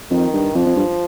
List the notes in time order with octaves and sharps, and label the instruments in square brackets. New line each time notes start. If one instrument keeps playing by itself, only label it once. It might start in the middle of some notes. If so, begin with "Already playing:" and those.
[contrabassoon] F2 [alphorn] D#3
[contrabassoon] G2
[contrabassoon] F2 [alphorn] F3
[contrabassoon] F2
G2